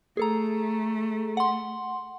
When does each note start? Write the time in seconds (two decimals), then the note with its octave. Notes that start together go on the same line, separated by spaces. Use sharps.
0.17 A3 G#4 A4 A#5
1.37 F#5 C6